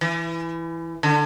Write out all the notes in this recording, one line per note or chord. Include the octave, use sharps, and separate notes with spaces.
E3
D3